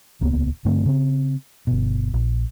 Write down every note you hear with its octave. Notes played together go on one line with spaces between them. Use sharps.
D#1 C#2 A#3 B3
G2 D3 A3 C4
C#3 C4
G1 B2
A#1